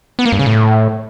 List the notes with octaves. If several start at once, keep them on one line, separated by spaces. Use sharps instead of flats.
B3
A#3
G2
C#3
A2